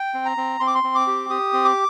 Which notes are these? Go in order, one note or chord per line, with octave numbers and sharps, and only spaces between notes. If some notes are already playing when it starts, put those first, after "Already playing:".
Already playing: G5
C4
A#5
C4
C4 C6
D6
C6
C4
D6
G4
G4 D#6
C4
D6